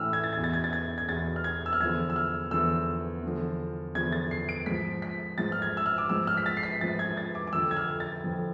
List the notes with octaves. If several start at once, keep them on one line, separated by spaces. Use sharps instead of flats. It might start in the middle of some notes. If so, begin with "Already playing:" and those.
Already playing: A2 E3 E6 F6
G#6
A6
E2 B2 G#6
A6
G#6
A6
G#6
G#6
E2 B2 A6
F6
G#6
E6
F6
E2 D3 F3 G#6
E6
F6
E2 D3 F3 E6
E2 D3 F3
E2 D3 F3 G#6
A6
C7
D7
G#2 F3 B6
B6
G#2 F3 A6
F6
G#6
E6
F6
D6
G#2 F3 E6
F6
B6
A6
C7
B6
G#2 F3 A6
G#6
A6
D6
D6
F2 D3 F3 E6
G#6
F6
A6
F2 D3 F3